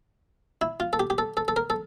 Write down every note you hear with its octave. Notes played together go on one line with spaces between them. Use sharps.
E4
F4
A4
G4
G4
A4
A4
A4
A#4
A4